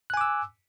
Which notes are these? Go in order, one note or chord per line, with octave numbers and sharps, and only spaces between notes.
G#5 D6 E6 F#6